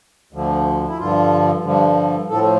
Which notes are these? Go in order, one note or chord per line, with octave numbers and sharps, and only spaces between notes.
D2 D3 F3
E4
G2 D3 F3 F4
G2 D3 F3
A2 F3 A4